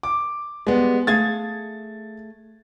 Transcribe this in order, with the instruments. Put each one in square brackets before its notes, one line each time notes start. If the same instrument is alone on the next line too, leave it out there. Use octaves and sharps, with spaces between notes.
[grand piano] D6
[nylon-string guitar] G3 D5 [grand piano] G#3 B3
[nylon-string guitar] A3 G#4 F5 [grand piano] G#6 A6